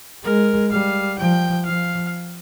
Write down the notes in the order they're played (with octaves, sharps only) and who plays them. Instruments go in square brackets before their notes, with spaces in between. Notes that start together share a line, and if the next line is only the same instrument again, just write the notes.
[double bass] G#3 [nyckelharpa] A#4
[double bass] G3 [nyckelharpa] F5
[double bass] F3 [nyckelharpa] G5
[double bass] F3 [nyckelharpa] F5